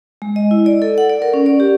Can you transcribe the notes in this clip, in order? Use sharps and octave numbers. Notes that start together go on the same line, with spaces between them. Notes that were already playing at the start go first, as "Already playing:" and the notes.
G#3
D#5
E4
D5
A4
F#5
D5
A#4
C#4
D5
G4